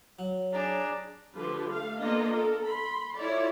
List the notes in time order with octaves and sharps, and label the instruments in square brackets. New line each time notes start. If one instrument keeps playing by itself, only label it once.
[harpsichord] F#3 [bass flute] C#5
[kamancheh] D4 [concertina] G#4 D5 A#5
[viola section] D3 F3 G4 B4
A3 F5
A#3 B3 D4 F4 A4 D#5
A4 A#4
B5 C6
E4 F4 A4 C#5 D5